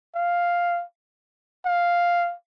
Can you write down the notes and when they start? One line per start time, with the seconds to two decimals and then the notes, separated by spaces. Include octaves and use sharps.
0.15 F5
1.66 F5